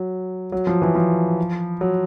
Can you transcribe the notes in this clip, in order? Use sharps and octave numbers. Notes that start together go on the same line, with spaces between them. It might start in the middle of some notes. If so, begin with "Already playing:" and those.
Already playing: F#3
F#3
F3
E3
F3
F#3